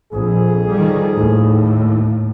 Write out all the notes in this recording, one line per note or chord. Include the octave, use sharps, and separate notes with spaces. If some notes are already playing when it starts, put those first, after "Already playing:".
A#1 F2 G#4
D#3 G3
D#2 A2